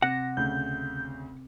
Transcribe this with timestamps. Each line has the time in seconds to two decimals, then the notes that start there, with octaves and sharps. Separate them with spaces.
0.02 C3 F#5 A#6
0.37 D2 C#3 G6